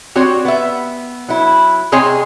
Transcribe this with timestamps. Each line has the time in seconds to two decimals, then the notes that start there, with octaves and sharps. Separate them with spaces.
0.15 C4 F#4 G4 C#5
0.45 B3 E5
1.28 F#3 E4
1.92 C3 C4 G#4 C#5 D#5 G#5